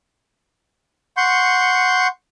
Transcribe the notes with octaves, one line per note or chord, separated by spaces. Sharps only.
F#5 C6 C#6 G6